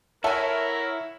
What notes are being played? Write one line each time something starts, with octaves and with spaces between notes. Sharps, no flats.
E4 A4 A#4 C#5 E5 F#5 G#5